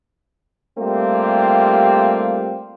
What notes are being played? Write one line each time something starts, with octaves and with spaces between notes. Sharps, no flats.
G3 A3 A#3 C4 F4 G4